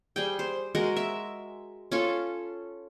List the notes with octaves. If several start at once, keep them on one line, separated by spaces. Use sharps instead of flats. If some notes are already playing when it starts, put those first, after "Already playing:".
G3 G#4 G5
C5
G#3 F#4 A#4
E5
C#4 F4 A4